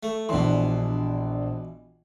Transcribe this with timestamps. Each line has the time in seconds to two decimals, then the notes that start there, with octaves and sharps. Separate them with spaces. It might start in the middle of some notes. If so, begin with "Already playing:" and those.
0.03 A3
0.29 A#1 B2 E3 D4 C6